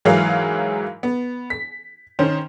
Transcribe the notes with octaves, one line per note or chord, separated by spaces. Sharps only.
G#2 E3 F#3 G#4 A#4 F5
B3
B6
D#3 C#4 C5